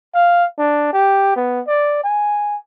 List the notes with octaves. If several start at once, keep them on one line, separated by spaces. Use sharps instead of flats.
F5
D4
G4
B3
D5
G#5